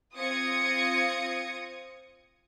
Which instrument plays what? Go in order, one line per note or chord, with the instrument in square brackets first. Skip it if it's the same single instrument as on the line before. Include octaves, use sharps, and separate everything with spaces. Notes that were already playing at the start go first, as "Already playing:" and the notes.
[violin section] C4 F4 D#6 G#6 A#6 C#7